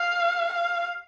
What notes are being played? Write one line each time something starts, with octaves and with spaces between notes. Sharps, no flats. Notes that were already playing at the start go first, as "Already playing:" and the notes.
Already playing: F5
F5